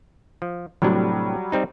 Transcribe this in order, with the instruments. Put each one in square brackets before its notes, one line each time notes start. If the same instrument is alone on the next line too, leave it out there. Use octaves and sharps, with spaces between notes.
[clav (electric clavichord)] F3
[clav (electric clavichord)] A2 C3 D4 [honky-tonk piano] F#3 G3
[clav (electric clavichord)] G3 C4 D#4